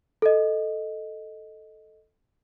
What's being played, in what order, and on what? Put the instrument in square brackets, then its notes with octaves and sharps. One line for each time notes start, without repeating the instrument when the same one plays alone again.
[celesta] A4 D#5